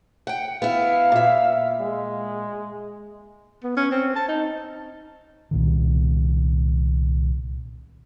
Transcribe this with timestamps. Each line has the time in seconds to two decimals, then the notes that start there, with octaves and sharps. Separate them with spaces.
0.27 F#5 G5
0.62 B3 E4 F5
1.12 A#2 E5
1.81 G#3
3.64 B3
3.76 C#4
3.91 C4
4.15 A5
4.28 D#4
5.51 C2 A#2 D#3